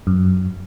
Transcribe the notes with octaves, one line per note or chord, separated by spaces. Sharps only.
F#2